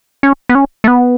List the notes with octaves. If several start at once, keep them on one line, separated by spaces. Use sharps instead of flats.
C#4
B3
C#4
A3
B3